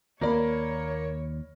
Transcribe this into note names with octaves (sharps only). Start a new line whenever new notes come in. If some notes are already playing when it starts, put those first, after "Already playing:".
D#2 A#3 C#5 D5 B5